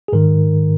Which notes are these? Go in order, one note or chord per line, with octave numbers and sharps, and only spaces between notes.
G#4
G#2 D#3 A#4